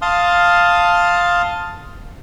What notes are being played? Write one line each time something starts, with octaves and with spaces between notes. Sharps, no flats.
F5 A5 C6 D#6 F6